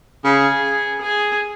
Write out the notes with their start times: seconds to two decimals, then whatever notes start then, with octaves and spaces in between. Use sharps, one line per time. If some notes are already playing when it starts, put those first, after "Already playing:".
0.24 C#3 G#4
1.01 G#4